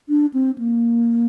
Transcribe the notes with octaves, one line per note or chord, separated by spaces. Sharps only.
D4
C4
A#3